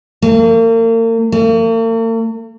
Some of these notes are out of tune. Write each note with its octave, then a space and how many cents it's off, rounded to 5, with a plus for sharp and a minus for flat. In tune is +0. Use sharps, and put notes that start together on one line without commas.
A#3 -40
A#3 -45